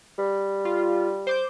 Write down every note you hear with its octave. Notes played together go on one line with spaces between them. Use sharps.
G3
F4
C5 D6 G6